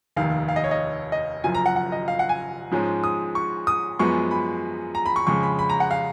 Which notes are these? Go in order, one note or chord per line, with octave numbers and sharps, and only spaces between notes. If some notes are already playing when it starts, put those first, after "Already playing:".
F1 D#2 D#3 F5
F5
D#5
C#5
D#5
D#5
F#1 F#2 F3 G#5
A#5
F#5
F#5
D#5
F5
F#5
G#5
G#2 F3 G#3 C#4
D#6
C#6
D#6
F#2 F3 G#3 B3 C#6
B5
A#5
B5
C#6
F2 C#3 G#3 C#6
B5
B5
A#5
F#5
F5